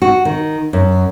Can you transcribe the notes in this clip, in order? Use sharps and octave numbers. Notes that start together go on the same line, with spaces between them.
F#4
D#3
F#2